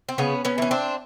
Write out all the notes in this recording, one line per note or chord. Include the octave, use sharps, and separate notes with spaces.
C4
C#3 B3 C#4
B3 C#4
E3 A3 C#4
C4 D4